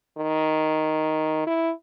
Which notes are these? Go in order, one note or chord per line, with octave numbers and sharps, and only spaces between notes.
D#3
E4